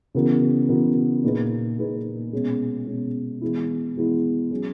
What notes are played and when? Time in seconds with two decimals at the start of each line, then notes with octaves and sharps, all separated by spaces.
0.15 C#3 E3 B3 F#4 A#4
0.69 C#3 E3 B3 F#4 A#4
1.24 A#2 A#3 D#4 G#4 B4
1.78 A#2 A#3 D#4 G#4 B4
2.33 B2 G#3 C#4
2.87 B2 G#3 C#4
3.42 E3 G#3 B3 E4
3.96 E3 G#3 B3 E4
4.51 F#3 C#4 G#4